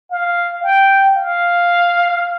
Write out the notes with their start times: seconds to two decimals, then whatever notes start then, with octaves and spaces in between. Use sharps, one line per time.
0.11 F5
0.63 G5
1.16 F5